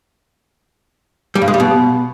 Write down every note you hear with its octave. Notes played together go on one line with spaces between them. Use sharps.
G3
G2
G#3
G3
B2